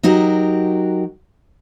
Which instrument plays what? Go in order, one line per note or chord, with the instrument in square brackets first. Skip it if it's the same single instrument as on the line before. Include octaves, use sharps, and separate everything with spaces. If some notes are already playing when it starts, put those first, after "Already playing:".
[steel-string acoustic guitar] F#3 D#4 F#4 G4 A#4